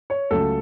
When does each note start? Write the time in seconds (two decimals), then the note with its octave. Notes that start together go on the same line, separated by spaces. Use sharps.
0.10 C#5
0.31 C#2 C#3 F#3 A3 A4